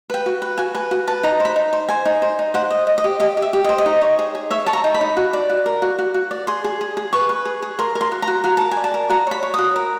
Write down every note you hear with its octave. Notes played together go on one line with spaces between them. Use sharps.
B4 G5
F#4
B4
F#4 G#5
B4 G#5
F#4
B4 A5
D#4 A#5
C5
B5
D#4
C5
C5 G#5
D#4
C5
D#4
C5 F#5
D#5
D#5
D#5
G4
G4 D#5
G4
E5
G4
D#5
C5
D#5
D#4
C#5
G#4
G#4
C#5 E5
C#5 A5
A#5
D#4
B5
D#4
F#4
D5
F#4
A#4
F#4
F#4
F#4
D5
G#4 C6
G#4
G#4
G#4
B4 C#6
B4
G#4
G#4
A#4 C6
A#4
C6
F#4
A#5
F#4
F#4 A#5
A#4 A5
G#5
D5
A5
A#4
F#4 A#5
C#5 B5
C#5
F#4 D#6
A#4